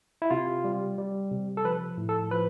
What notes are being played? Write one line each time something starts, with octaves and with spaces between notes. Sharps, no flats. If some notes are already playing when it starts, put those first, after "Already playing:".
E4
C3 F4
G3
G3
C3
A4
F3 B4
A2
A4
F3 B4